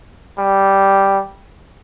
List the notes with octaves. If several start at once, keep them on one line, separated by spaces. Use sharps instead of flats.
G3